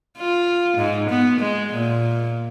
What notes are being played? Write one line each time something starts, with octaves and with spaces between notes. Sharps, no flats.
F4
G#2
B3
G#3
A#2